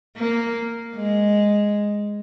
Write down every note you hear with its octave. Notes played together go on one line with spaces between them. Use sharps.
A#3
G#3